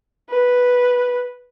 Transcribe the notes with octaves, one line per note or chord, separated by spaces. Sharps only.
B4